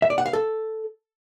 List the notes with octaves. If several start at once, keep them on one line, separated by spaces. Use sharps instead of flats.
E5
D5
F#5
F5
A4